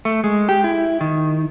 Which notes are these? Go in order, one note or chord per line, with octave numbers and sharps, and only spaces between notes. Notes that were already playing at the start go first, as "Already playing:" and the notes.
A3
G#3
G4
E4
D#3